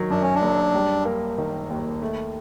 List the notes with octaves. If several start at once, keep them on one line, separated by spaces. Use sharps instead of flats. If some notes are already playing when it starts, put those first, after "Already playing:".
Already playing: D#3 F#3
F#2 D4
C#4
D4
F#1
G3
A#3
D#3
D#2
A3